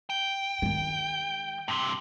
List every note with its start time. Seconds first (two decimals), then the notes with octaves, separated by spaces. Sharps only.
0.10 G5
0.62 D#3 G#3
1.68 G2 C3